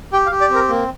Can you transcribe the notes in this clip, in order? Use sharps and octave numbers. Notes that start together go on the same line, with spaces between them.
G4 G5
F5
G4
D5
C4 A#4
A#3